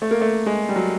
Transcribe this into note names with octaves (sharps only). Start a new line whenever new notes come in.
A3
A#3
A3
G#3
G3
F#3